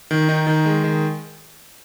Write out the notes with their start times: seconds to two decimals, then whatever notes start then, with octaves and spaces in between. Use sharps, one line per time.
0.11 D#3
0.29 D#4
0.47 D#3
0.66 G#3
0.84 D#3